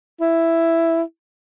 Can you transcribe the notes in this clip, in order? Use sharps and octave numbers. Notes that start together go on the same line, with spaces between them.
E4